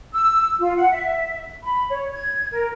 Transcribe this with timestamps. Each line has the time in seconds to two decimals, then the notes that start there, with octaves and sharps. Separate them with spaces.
0.13 E6
0.59 F4
0.77 F#5
0.91 E5
1.63 B5
1.90 C#5
2.12 G#6
2.52 A#4